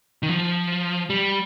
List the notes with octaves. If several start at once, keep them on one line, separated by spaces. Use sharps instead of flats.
D#3
F3
G3